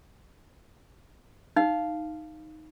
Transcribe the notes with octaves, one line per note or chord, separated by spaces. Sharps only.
D#4 F5